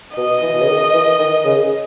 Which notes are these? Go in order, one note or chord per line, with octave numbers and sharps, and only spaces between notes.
B2 D#5
E3
B2
C#3
D#3
E3
D#3
C#3